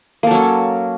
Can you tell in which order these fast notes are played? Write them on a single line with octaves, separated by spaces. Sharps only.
A#3 A4 F#3 C#4